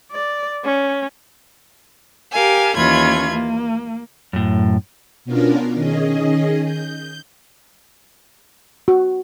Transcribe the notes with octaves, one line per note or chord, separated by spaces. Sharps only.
D5
C#4
G4 A#4 F5 G#5
D#2 E3 C#4 F4 B5 G#6
A#3
F#2 A2
B2 B3 C#4 D4 F4 A#4
D#3 C#4 G#4 D#5
G6
F#4